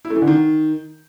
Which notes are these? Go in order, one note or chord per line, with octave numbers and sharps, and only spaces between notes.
E4
A3
E3
D3
D#3